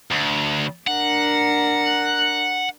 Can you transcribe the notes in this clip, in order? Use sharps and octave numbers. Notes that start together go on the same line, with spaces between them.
D2
D4 A#4 F#5